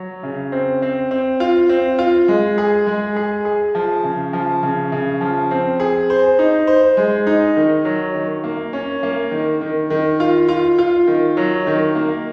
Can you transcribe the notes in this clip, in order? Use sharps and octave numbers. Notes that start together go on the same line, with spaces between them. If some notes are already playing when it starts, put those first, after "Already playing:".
Already playing: F#3
C#3
C4
C4
C4
F4
C4
F4
G#3
G#4
G#3
G#4
G#4
F3
C#3
F3
C#3
C#3
F3
C4
G#4
C5
D#4
C5
G#3
D#4
D#3
F#3
D#3
A#3
C#4
A#3
D#3
D#3
D#3
F4
F4
F4
D#3
F#3
D#3
A#3